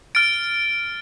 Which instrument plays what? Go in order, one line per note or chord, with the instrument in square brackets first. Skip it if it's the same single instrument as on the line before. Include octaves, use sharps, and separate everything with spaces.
[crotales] F6 A6 D7